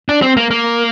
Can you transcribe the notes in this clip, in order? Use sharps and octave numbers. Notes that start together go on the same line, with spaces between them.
D4
C4
A#3
A#3